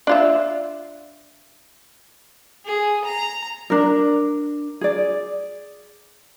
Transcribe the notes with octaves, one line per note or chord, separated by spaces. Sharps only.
D4 F4 E5
G#4
A#5
D4 A#4
G#4 D5